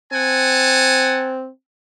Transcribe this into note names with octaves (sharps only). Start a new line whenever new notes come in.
C4 F#5 G#5 A5